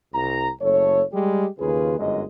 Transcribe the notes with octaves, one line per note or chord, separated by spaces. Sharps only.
C2 A#5
F#1 A3 A4 C#5
G3 G#3 G4
D#2 C#3 F4 G#4 B4
G1 F#2 G#3 D#5